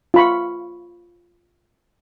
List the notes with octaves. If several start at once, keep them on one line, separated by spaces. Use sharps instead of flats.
F4 B5 C#6